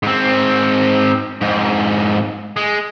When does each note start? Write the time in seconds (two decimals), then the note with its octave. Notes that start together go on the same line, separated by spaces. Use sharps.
0.03 G#2 C4
1.41 F2 G#2
2.57 G#3